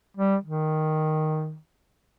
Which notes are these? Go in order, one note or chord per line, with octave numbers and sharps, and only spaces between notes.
G3
D#3